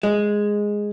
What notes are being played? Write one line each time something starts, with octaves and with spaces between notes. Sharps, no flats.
G#3